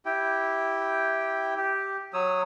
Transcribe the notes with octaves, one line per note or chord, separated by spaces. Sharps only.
E4 G4 G5
G4
F#3 C#5 D#6 E6